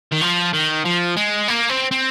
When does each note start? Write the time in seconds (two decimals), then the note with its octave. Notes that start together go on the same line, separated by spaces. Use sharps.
0.12 D#3
0.21 F3
0.53 D#3
0.85 F3
1.16 G#3
1.48 A#3
1.69 C4
1.91 C4